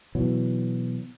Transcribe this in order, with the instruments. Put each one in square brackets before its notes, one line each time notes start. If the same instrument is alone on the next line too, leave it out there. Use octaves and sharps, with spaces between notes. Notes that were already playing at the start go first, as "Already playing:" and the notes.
[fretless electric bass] B2 E3 F#3